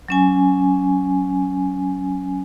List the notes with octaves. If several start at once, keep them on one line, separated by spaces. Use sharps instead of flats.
F#3 C#4 G#5